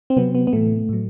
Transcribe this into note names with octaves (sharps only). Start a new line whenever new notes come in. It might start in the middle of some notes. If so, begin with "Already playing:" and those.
C4
C3 F#3 B3
B3
B3
A2 E3 A3
A2 F#3